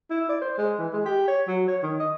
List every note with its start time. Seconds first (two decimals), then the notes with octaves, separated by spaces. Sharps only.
0.10 E4
0.29 D5
0.41 C5
0.58 G#3
0.78 E3
0.93 G#3
1.06 G4
1.28 C#5
1.47 F#3
1.68 C#5
1.82 D#3
2.00 D#5